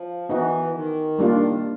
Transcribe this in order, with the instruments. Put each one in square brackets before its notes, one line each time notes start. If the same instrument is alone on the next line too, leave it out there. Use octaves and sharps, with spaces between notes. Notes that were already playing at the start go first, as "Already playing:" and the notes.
Already playing: [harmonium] F3
[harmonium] E3 [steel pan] B3 D#4 F#4
[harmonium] D#3
[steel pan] G3 A#3 D4 F4